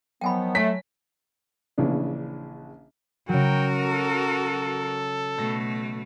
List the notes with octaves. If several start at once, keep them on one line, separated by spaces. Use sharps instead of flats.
D#3 F3 F#3 B3 G5 G#5 B5
A3 C#5 G#5 A5 B6
A#1 C#3 E3 D4
C#3 F#3 F#4 A#4 G5
A4
B2 A3 A#6